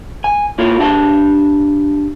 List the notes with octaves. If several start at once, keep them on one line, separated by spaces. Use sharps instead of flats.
G#5
A#3 E4 F4 C#5
D4 G4 E5 A5